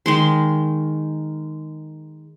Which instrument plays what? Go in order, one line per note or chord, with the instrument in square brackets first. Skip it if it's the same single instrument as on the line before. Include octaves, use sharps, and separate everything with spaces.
[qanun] D#3 G#3 C6